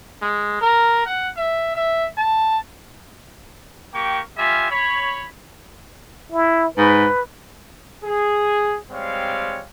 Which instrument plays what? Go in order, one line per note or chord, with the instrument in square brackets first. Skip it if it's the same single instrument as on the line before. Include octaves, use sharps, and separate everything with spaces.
[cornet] G#3
A#4
F#5
E5
E5
A5
[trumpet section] A#3 G4 G5 C#6
G3 F4 E5 G#5
C#5 B5
[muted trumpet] E4
[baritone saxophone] G#2 [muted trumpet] B4
[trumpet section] G#4
G3 G#3 C4 C#5 F5